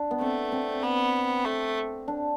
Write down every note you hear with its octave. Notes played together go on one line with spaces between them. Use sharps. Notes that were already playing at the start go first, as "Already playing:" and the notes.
Already playing: D4
B3
A3 C4
C4
B3
A3
D4